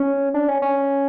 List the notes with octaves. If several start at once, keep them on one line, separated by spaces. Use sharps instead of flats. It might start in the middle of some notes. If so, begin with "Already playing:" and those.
Already playing: C#4
D4
C#4
C#4